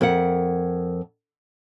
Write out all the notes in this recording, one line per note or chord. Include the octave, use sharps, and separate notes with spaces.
F2 A#4 E5 F#5